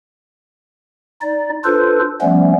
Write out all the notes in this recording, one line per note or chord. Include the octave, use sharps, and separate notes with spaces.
D#4 D5
D4 F4 A4 B4 C5
F3 G3 A3 B3 C#4